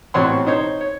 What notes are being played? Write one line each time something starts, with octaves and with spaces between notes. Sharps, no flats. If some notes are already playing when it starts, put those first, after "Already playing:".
A1 B2 C4 C#5 F#5 C6
D#4 C5 C#5
C#5